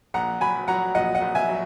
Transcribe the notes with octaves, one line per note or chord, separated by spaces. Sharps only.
A#1 F#5 A#5
F#3 G#5 B5
F#3 F#5 A#5
A#1 D#5 F#5
D#5 F#5
A#1
E5 G#5
F#3